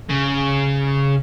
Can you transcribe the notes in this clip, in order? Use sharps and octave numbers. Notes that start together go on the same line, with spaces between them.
C#3